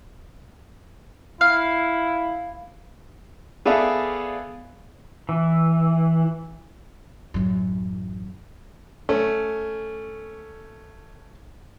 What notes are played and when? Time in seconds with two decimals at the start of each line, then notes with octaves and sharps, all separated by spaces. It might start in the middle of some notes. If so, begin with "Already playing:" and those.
1.41 E4 F5
3.65 B3 G#4 A4 D5 E5 F5
5.29 E3
7.34 A1 F#2
9.09 A3 C#4